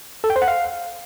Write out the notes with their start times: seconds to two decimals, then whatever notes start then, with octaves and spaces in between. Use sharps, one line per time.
0.24 A4
0.30 G5
0.36 C5
0.42 F#5
0.48 F5